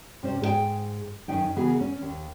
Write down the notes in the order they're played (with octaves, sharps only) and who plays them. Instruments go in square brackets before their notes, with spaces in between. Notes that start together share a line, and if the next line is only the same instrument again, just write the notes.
[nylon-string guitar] C3 C#4 C5
G#2 G#4 A4 G5
F#2 B2 D#3 C#4 D#4 G5
C#3 E3 B3 F#4 G#4 A#4
C#4
D#2